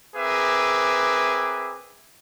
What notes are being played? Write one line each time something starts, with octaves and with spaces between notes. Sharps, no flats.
C4 G#4 A#4 B4 E5 D6